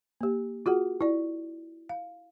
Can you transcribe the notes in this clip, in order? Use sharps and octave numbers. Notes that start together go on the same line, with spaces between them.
A#3 G4
F4 F#4 G#4 F#5
E4 D5
F5